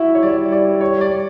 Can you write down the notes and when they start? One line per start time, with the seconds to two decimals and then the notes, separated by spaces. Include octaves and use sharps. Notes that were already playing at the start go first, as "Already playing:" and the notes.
Already playing: E4 F#4 E5
0.15 C#5
0.22 G3 D5
0.52 D5
0.81 C#5
1.01 D5